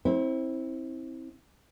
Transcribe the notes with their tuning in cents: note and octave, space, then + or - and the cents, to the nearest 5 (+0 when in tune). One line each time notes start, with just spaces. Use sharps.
C4 +15 E4 -25